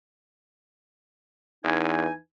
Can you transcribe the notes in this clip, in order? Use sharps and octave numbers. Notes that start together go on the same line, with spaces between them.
E2 E3 D#4 G#5